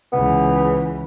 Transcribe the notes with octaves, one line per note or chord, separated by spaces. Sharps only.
C#2 E3 B3